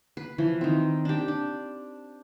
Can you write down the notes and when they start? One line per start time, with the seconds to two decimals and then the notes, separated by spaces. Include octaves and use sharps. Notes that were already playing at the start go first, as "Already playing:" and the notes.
0.17 B4
0.38 E3 F3
0.61 D#3 C4
1.05 D4 G4
1.28 D4